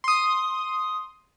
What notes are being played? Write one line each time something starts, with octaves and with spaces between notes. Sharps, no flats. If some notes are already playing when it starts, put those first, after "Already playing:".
C6 D#6